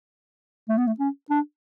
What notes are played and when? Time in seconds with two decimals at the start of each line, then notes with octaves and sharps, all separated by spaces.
0.69 A3
0.78 B3
0.87 A3
0.99 C#4
1.30 D4